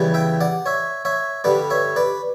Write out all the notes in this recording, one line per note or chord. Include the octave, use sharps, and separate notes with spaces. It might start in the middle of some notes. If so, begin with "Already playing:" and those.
Already playing: E2 C#3 E3 G3
E5 G5
D5 F#5
C#5 E5
C#5 E5
G2 D3 G3 B4 D5
C#5 E5
B4 D5